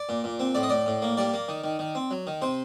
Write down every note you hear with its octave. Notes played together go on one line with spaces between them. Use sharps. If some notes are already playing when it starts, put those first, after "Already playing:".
Already playing: D5
A#2
A#2
C4
A2 D5
D#5
A2 D5
A2
A#3
G3 D5
A#3
D#3
D#3
D#3
C4
F#3
D#3
C3 C5